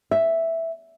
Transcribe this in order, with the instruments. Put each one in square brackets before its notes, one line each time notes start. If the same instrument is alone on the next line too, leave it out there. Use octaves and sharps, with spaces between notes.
[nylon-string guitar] E5